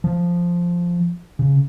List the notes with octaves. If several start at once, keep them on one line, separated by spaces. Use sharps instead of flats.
F3
C#3